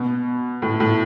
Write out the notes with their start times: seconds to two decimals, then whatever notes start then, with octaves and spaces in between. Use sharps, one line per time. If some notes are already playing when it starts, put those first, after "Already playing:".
Already playing: B2
0.62 A2
0.80 A2